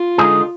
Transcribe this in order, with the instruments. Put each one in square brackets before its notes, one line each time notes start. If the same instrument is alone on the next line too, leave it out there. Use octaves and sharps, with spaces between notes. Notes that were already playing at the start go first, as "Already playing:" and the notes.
Already playing: [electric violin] F4
[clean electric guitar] D3 G#3 D#4 G#4